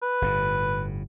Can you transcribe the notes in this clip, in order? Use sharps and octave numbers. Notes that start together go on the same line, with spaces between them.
B4
G1 A2